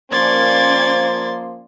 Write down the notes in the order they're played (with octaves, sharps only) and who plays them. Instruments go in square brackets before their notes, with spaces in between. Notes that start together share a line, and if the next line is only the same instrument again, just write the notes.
[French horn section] F3 A#3 C5 [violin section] C#4 D5 G#6 [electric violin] C6 A6